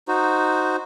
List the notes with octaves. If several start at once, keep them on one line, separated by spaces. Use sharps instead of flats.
D#4 F#4 C5